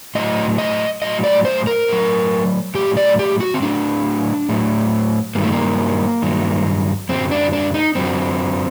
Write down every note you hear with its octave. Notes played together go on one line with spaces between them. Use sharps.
A2 F#3 D#5
D#5
A2 F#3 D#5
D5
C5
A#4
A2 F#3
A2 F#3 G4
D5
G4
F#4
C4
A2 F#3 D4
A2 F#3
G2 D#3 F#3 A#3
A3
A#3
G2 D#3 F#3
F#2 D3 F#3 C4
D4
D4
D#4
F#2 D3 F#3 C4